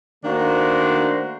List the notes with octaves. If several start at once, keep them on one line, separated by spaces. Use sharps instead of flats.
D#3 A3 A#3 D4 F#4 C5